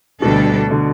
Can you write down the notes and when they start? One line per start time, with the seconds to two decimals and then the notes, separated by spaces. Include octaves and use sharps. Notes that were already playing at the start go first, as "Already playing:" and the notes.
0.21 D2 B2 D3 G3 D4 A4
0.71 D3